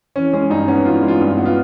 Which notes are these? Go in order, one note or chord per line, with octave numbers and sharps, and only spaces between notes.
E3 C#4
G#3 C#4
G2 D#4
B3 C#4
E3 F4
G#3
F4
G2
F4
B3
F4